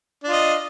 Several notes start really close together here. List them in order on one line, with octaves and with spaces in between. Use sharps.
D4 F4 D#5